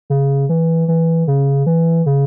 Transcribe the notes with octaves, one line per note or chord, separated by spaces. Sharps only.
C#3
E3
E3
C#3
E3
C#3